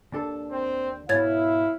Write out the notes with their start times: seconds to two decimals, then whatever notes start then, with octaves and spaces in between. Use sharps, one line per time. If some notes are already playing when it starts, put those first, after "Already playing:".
0.12 D#2 D4 A4
0.51 C4
1.09 G#2 B2 E4 C#5 F5 G#6 A6